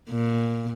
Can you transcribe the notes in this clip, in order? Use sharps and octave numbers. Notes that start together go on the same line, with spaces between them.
A#2